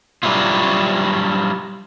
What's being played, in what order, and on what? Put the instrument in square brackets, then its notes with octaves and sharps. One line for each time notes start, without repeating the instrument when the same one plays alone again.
[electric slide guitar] F#3 G3 D4 E4 F4